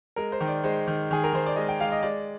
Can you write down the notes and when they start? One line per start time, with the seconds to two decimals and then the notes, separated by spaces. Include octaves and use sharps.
0.16 G#3 A#4
0.32 C5
0.41 D#3
0.48 D5
0.64 G#3 C5
0.87 D#3
1.11 D#3 G#4
1.24 A#4
1.33 D#3 C5
1.46 D5
1.56 G#3 D#5
1.69 G5
1.80 G#3 F5
1.92 D#5
2.03 G#3 D5